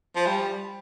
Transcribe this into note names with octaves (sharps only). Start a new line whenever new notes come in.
F3
G3